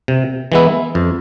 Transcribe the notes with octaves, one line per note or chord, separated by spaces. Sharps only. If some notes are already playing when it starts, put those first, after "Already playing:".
C3
E3 G#3 B3 E4
F2